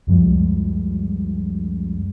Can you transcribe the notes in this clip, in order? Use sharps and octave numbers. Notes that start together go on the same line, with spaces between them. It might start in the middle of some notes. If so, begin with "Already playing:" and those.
C#2 F#2 F3 G3 G#3